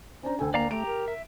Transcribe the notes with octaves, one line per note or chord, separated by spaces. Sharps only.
C#4 D4 C5 A#5
D2 A4 G5 G#5
A#3 D5 F5 A#5
A3 G4 A#5 D7
A#4
E5